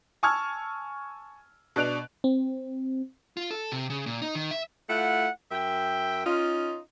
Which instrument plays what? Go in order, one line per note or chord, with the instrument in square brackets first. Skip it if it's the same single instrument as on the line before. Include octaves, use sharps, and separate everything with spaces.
[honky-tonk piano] G#5 A5 C#6 E6 F6 G#6
B2 D4 F#6 D7 F7
[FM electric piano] C4
[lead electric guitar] F4
A4
C3
C#3
A#2
D#4
D#3
E5
[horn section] A3 E4 F4 F#5
F#2 E5 G5
C#4 D#4 F4